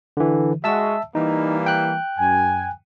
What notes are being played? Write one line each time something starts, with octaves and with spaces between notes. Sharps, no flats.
D3 E3
G#3 F#4 E5 A5 E6
E3 G3 A#3 D#4
G5 F#6
F#2 G#5